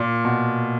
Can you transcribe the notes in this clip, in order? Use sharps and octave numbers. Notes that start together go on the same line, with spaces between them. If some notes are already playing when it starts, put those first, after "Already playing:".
Already playing: A#2
B2